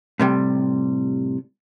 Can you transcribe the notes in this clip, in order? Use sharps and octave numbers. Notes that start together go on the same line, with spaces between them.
A2 C3 G3